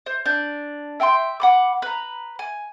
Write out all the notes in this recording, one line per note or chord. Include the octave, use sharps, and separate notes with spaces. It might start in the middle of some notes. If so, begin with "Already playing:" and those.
C5
D4 G6
E5 G5 G#5 C6
F#5 B5 D6
B4 A#5
G#5